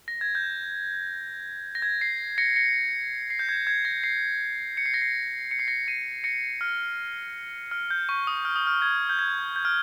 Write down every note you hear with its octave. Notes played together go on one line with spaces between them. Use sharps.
A#6
G#6
G6
A#6
G#6
C7
A#6 C#7
A#6 C#7
C7
G6
G#6
G#6
A#6
C7
C#7
C7
A#6
C7
C#7
C7
A#6 C#7
C7 D#7
A#6 C#7
F6
F6
G6
C#6
D#6
F6
D#6
F6
G#6
G6
G#6
G6
F6